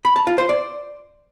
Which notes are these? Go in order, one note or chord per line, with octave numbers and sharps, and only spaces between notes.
B5
A5
F4
C5
D5